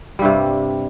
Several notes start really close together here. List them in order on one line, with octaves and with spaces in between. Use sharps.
G3 G2 C3